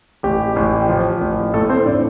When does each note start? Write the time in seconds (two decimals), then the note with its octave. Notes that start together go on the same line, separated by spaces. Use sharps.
0.23 A1 G4
0.56 A1
0.89 F3
1.21 A1
1.53 A2 A3 A4
1.70 C4 C5
1.85 A2 D4 D5